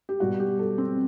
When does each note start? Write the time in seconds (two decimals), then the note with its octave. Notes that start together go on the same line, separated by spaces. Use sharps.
0.09 G4
0.20 B2 G3 F#4
0.40 G4
0.59 A4
0.78 C4